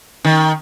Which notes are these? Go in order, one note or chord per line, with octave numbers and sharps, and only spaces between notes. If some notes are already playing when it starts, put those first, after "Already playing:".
D#3